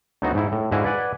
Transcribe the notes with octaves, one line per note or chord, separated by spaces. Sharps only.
D2 F#3 B3 C4 D#4 F#4
G#2 D#4 E4
A2
G#2 D3 E4 F#4 F5 G#5
B4 D5 F#5 G#5